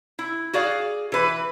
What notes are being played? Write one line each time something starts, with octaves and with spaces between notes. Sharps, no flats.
E4
F#4 G#4 D5 F5
E3 B4